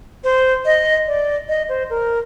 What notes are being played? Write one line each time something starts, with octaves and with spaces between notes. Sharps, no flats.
C5
D#5
D5
D#5
C5
A#4